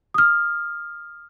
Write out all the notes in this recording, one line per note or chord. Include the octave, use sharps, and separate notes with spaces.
D#6 F6